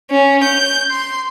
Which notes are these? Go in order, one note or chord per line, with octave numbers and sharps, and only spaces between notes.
C#4
G6
C6